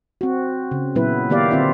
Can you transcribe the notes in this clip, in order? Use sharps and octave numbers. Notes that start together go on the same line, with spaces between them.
C4 F#4
C#3
A#2 F#3 B3 E4 B4
D#3 A#3 B3 G4 D5 F5
D3 C4 F4 E5